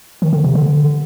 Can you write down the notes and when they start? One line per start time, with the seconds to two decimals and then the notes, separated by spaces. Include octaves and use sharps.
0.22 D#3
0.33 D3
0.44 C3
0.55 D3